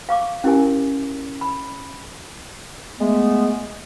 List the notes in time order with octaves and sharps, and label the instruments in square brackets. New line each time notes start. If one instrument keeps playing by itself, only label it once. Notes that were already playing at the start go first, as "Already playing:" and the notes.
[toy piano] F5 C#6 D6
C#4 E4 G4 A#4 G#5
B5
[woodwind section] G#3 A3 B3